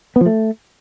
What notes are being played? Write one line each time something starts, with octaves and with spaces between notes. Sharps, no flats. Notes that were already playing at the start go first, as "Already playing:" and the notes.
B3
F3
A3